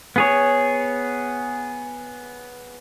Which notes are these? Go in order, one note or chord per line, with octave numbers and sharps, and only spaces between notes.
B3 G#4 C#5